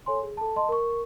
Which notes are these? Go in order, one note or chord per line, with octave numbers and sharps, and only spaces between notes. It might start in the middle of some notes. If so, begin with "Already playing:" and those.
A4 C#5 G#5 C6
G#4
A4 A5
D#5 A5 C6
A#4 C#6